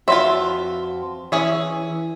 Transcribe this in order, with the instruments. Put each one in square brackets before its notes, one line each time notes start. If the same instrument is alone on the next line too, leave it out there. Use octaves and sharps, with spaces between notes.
[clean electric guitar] F2 F#4 C5 [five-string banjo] F4 B4 E5
[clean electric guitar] E3 [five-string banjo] C#4 G#4 E5